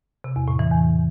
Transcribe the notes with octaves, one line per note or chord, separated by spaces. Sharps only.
C3
E2
A2
E3
E2